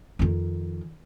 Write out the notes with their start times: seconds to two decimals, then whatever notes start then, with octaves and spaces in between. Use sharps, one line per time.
0.19 F2 D#3